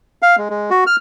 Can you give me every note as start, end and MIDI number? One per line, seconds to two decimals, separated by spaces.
0.22 0.36 77
0.38 0.48 56
0.50 0.70 56
0.70 0.84 66
0.87 0.96 89